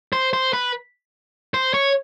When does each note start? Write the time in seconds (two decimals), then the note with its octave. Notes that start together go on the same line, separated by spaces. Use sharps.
0.13 C5
0.33 C5
0.53 B4
1.54 C5
1.74 C#5